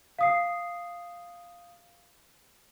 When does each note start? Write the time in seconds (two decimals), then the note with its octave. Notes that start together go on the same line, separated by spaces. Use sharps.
0.19 F5 D#6 C7